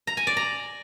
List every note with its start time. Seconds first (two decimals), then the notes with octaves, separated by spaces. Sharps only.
0.07 A#5
0.17 G#5
0.27 D5
0.37 A#5